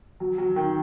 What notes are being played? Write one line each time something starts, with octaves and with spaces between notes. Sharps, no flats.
F#3
F#3
D#3